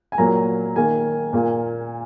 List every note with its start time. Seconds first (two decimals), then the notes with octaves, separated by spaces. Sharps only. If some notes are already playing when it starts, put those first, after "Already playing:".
0.12 G#5
0.18 A#2 F#3 A#3 A#5
0.76 D#3 A#3 G#5
1.33 A#2 A#3